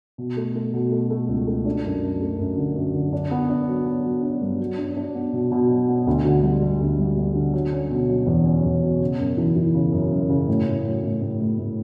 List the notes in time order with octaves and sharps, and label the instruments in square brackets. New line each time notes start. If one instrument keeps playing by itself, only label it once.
[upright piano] B2
A3
A3
B2
A3
A3
C#2
A3
D4
F#2
F#2
A3
F#2
D3
F#2
D3
D4
B3
D4
F#3
B3
F#3
D4
G2
F#3
D4
D4
B3
B2
B2
F#3
B3
D2
D3
G3
G3
D2
G3
G3
D3
F#3
C#4
B2
F#3
E2
C#4
E2
B2
C#3
F#2
E3
E3
C#3
F#2
F#2
C#3
A2
A2
F#3
A2
A2
A2
A2